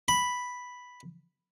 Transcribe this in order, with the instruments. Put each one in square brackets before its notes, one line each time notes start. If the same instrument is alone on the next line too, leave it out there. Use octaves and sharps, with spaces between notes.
[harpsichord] B5